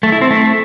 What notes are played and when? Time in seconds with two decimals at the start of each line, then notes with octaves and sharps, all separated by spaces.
0.03 A3
0.12 E4
0.21 C4
0.31 A3